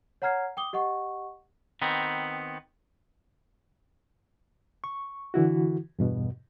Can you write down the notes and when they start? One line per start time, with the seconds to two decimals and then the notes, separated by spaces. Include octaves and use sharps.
0.22 C#5 F#5 A#5 F6 G#6 C7
0.57 G5 D6 D#6 G7
0.73 G4 D#5 F#5 C#6
1.82 D#3 B3 C4
4.84 C#6
5.34 D3 E3 E4 F#4
5.99 E2 G2 B2